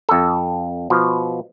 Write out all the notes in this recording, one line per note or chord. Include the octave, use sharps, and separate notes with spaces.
F2 A4
B2 F3